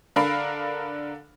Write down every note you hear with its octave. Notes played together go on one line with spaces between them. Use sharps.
D3 D4 A#4 F5 B5